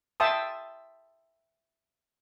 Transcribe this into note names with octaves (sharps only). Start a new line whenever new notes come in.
E5 G5 A5 C6 D#6